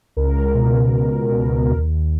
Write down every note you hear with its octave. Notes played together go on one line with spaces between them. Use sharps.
C#2 A#4
B2
C#2
B2
D#2